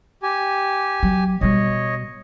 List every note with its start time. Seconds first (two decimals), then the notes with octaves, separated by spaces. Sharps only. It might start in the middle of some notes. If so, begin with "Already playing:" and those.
0.23 G4 G#5
1.03 F#3
1.41 B2 G3 C#5 D#5